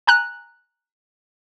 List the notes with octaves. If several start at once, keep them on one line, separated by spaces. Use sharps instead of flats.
G#5 A#5 F#6